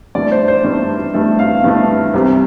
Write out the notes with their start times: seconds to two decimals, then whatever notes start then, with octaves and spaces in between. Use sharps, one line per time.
0.15 G2 E3 A3 D5
0.32 C5
0.48 C5
0.64 G2 E3 A3
1.14 G2 E3 A3
1.39 F5
1.64 G2 E3 A3
2.14 C2 C3 G3